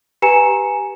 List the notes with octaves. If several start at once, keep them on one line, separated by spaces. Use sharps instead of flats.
G4 B4 G#5 A#5 C#7 E7